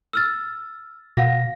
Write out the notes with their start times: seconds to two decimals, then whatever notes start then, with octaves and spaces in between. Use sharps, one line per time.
0.13 E6 F6 A6
1.17 B2 F5 F#5 A#6